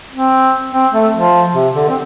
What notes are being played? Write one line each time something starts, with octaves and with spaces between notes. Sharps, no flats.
C4
C4
A3
F3
C3
D3
C4